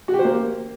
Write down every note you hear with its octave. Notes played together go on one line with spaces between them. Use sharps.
F#4
G4
C5
A#3